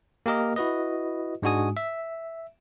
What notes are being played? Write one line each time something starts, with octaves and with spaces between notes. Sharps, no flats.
A#3 G4 A#4 D#5
E4 F#4 B4 D#5
G#2 G#3 D4 F#4 G#5 D#6
E5